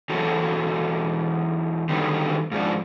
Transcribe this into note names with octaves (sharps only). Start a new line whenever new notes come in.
E2 F#3 F#4 A4
D3 D#3 F#3 G3 B3
G#2 F3 D4